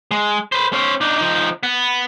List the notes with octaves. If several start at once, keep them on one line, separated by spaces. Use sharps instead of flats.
G#3
B4 C5
C#4 C5
D4 D#4
F3 D#4
B3